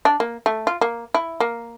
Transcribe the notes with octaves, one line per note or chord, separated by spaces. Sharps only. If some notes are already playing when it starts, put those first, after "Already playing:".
D4
A#3
A3
F4
A#3
E4
A#3